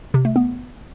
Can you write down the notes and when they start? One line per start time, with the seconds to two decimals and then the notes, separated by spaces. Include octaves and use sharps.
0.14 C3
0.25 A3
0.36 B3